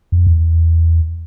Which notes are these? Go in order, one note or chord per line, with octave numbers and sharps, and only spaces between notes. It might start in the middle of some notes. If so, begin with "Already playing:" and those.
F2
E2